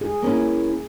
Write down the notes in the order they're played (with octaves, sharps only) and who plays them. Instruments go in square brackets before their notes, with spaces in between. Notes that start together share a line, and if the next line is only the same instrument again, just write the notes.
[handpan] G#4
[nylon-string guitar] A#3 C#4 E4